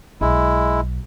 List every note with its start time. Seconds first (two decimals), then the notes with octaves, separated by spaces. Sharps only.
0.21 B1 G#3 E4